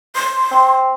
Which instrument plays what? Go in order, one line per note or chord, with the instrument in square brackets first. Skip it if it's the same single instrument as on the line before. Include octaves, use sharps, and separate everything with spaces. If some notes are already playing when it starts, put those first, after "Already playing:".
[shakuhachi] C6
[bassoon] C4